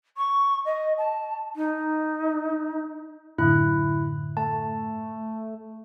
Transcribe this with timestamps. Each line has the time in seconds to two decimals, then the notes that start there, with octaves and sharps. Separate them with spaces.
0.17 C#6
0.65 D#5
0.98 A5
1.56 D#4
3.38 F#2 A2 D3 E4 F#6
4.37 A3 A5